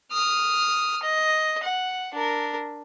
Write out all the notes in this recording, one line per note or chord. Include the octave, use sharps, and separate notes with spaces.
D#6 F6
D#5
F#5
D4 A#4